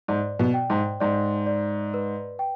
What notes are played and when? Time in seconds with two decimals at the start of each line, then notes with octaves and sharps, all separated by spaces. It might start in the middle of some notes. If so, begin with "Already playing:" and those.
0.08 G#2 D5
0.39 B2
0.54 G5
0.70 G#2
1.00 G#2 D5
1.46 D5
1.94 B4
2.39 G5